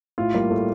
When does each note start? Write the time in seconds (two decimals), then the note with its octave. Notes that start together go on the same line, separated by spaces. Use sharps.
0.18 A2 F4
0.34 G3 A#3
0.51 A2 A3